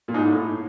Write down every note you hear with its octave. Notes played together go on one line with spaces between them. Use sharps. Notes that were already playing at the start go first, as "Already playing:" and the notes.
A#2
G#2
A2